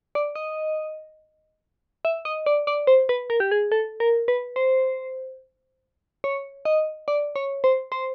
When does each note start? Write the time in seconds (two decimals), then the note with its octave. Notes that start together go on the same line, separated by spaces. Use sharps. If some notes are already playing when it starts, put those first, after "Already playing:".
0.15 D5
0.36 D#5
2.05 E5
2.25 D#5
2.46 D5
2.67 D5
2.87 C5
3.09 B4
3.30 A#4
3.40 G4
3.51 G#4
3.72 A4
4.00 A#4
4.28 B4
4.56 C5
6.24 C#5
6.65 D#5
7.08 D5
7.36 C#5
7.64 C5
7.92 C5